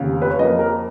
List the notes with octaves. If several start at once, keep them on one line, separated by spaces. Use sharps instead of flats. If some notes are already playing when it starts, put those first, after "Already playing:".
Already playing: F1 D#2 C#3
B4
C#5
F2 F3 A#3 D#5
A#4